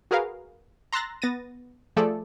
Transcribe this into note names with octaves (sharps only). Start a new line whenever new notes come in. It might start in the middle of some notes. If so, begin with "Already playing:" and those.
F#4 G#4 A#4 B4 F5
A#5 C6 E6 F#6 A6 A#6
B3 A6 A#6 D#7
F3 A3 G#4 A4 D5